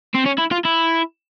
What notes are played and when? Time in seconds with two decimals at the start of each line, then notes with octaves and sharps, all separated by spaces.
0.15 C4
0.26 C#4
0.38 E4
0.51 F4
0.65 E4